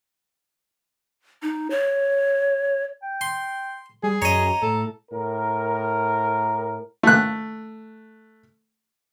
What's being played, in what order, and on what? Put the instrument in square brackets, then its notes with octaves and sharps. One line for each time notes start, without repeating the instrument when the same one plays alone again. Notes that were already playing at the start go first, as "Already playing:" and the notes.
[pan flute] D#4
C#5
[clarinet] G5
[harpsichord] C6
[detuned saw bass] G3 [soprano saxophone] G#4
[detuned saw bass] F#2 [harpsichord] C#5 D#5 [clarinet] A#5
[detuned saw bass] A2 [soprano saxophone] A4
[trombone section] A2 A#4
[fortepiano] A3 F#6